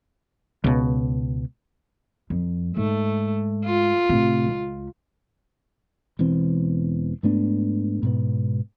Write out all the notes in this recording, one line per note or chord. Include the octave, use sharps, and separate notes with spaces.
C#2 B2
F2
G#2 A3
F4
A2 C3
C#2
E1 E2 E3 C4
G#2 A3 B3 D4
G#2 B2 B3